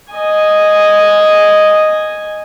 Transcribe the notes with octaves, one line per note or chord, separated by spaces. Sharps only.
D#5 G#5